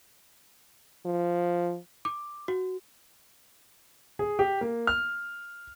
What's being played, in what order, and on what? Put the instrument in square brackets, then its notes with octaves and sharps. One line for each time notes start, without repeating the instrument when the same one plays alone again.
[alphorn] F3
[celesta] D6
F#4
[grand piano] G#4
G4
A#3
F6